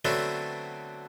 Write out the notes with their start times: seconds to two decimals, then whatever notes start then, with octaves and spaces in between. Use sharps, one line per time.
0.05 D3 F#3 A3 B3 C4 D4